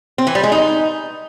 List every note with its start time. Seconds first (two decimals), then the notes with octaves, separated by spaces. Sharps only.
0.18 C4
0.27 E3
0.35 G3
0.43 G#3
0.52 D#4